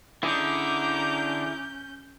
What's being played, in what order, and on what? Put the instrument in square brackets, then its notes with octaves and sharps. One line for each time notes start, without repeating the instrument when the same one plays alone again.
[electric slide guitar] D3 [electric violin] C#4 G6 [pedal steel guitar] E4 G#4 D#5 [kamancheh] A#5 D6